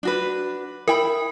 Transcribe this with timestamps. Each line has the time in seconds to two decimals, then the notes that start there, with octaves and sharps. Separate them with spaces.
0.03 D4 F#4 B4
0.88 E4 A#4 G5 B5